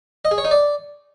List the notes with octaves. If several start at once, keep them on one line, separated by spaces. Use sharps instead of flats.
D#5
G#4
C#5
D#4
D5